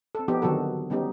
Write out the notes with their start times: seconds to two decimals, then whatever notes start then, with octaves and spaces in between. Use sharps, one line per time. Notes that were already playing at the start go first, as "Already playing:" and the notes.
0.15 C4 A4
0.28 F3 B3 D#4 G4
0.42 D3 D#3 F#3 F#4 A4
0.90 G3 B3 C#4 D#4 G4